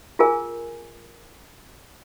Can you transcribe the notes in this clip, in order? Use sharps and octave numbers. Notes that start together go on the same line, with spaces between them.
F4 G#4 A#4 G#5